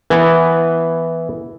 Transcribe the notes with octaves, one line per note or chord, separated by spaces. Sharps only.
E3 B3